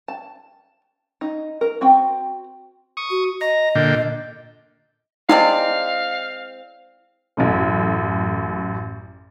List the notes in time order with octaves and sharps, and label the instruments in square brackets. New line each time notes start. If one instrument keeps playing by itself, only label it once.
[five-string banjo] A5
D#4
A#4
C4 F#4 G5
[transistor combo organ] C#6 D#6
[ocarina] F#4
[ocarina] D#5 [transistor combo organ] A#5
[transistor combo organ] A#2 D3 G5
[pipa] G#3 C4 D5 [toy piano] E4 [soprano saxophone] F5
[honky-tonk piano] A1 F#2 A2